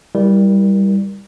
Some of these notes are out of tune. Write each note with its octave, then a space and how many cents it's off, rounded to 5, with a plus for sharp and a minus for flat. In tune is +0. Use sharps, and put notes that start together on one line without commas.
G3 +5 E4 -5 A#4 +25